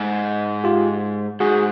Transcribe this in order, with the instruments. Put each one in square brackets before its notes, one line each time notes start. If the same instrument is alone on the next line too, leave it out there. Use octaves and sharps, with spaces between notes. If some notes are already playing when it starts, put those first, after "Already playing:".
Already playing: [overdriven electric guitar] G#2
[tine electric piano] F4 G4
[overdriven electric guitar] G#2 [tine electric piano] F#4 G#4